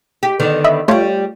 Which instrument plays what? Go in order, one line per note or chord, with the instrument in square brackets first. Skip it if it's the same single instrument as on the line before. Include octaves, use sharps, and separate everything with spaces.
[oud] G4 [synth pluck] B6
[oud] D3 D#3 B3
[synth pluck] D#5 E5 B5
[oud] G3 G4 [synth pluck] A3 F4 C#5